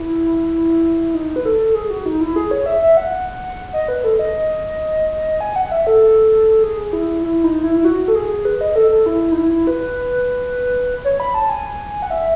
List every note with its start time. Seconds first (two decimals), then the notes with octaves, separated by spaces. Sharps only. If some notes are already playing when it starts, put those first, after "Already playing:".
Already playing: E4
1.14 D#4
1.36 B4
1.45 A4
1.75 G#4
1.90 F#4
2.06 D#4
2.21 E4
2.36 G#4
2.51 C#5
2.66 E5
2.82 E5
2.97 F#5
3.73 D#5
3.88 B4
4.04 A4
4.19 D#5
5.41 G#5
5.56 F#5
5.72 E5
5.87 A4
6.63 G#4
6.93 E4
7.23 E4
7.44 D#4
7.64 E4
7.77 E4
7.85 F#4
8.08 A4
8.15 G#4
8.45 B4
8.61 D#5
8.76 A4
8.91 A4
9.06 E4
9.32 D#4
9.37 E4
9.67 B4
11.05 C#5
11.20 B5
11.34 A5
11.49 G#5
12.02 F#5
12.10 E5